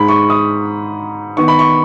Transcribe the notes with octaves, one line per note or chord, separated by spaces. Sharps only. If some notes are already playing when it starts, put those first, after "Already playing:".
Already playing: G#2 G#3 D#4 B5
C#6
D#6
D#3 B3 D#4 C#6
B5
C#6